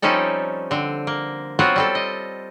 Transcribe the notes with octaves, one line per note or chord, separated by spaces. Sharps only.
F3 G3 C4 C#4 D#4 A4
D3 C4
A#3
F#3 B3 C4 F4 F#4
G3 C4 A4
D#5